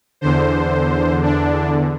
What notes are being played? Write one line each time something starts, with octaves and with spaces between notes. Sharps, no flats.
E2 D3 C5
D4